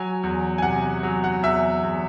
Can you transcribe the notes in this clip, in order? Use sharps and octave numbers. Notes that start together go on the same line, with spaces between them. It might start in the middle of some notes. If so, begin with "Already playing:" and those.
Already playing: F#3 G#5
E2
G#5
C3 F#5
F#3
F#5
E2 E5
E2